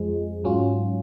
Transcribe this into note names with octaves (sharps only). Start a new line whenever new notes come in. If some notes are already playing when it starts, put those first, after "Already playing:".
Already playing: F2 F3 G#3
G#2 F#3 C#4 F4